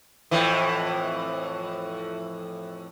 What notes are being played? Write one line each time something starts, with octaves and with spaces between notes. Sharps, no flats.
F2 A2 E3